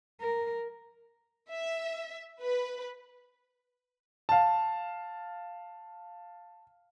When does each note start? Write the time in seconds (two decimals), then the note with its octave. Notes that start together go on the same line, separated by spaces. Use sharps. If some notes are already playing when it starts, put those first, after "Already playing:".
0.21 A#4
1.52 E5
2.42 B4
4.29 F5 A5